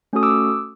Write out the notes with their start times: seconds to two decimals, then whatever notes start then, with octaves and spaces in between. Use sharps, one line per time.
0.13 A3 C#4 F#4 A4 D#6
0.23 D6 E6